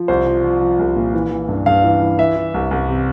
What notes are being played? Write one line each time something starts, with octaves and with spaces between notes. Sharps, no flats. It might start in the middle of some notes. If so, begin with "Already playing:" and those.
Already playing: F3
C2 C5
F3
F3
F3
C2
A#2
E3
E3
G2
G2 F5
E3
E3
E3 E5
E3
C2
C2
C3